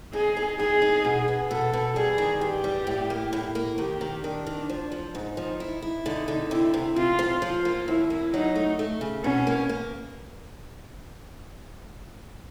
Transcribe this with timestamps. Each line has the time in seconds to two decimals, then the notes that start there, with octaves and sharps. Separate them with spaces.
0.13 D#4 G#4
0.37 D#4
0.59 D#4 G#4
0.82 D#4
1.05 B2
1.28 B3
1.50 B2 A4
1.73 B2
1.96 G3 G#4
2.18 D#3
2.41 G2 G4
2.64 G3
2.87 A2
3.10 A#3
3.33 A2
3.55 A#3
3.78 D#3 G4
4.01 D#3
4.23 D#3 D4
4.46 D#3
4.70 F3
4.92 F3
5.15 G#2 D#4
5.37 F3
5.60 E4
5.82 E4
6.06 D3 D#4
6.28 D3
6.51 C3 E4
6.74 C3
6.96 C3 F4
7.19 F3
7.42 F3 F4
7.65 A#3
7.87 D#2 E4
8.10 A#3
8.33 F#3 D#4
8.56 A3
8.79 A3
9.01 C#3
9.24 B2 C#4
9.47 A#3
9.69 A#3